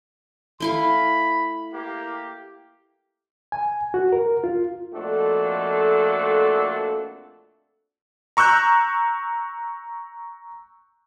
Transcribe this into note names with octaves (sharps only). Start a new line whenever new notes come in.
A3 E4 F5 B5
A#3 G4
G#5
F#4
A#4
F4
A#1 F2 A3 D4 F#4 A4
A#5 C#6 E6 F#6 G6